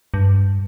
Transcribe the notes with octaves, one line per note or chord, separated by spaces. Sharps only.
G2